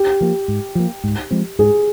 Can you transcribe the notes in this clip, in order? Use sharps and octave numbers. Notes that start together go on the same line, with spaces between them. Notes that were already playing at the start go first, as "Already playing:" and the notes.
Already playing: G4
F3 A#3
G#2
F3 A#3
G#2
F3 G#3 C4
G#2 G#4